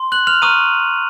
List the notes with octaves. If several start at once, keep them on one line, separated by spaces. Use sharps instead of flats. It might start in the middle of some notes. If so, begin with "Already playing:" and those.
Already playing: C6
F#6 F#7
F6 F7
A#5 C#6 D#6 F6 D#7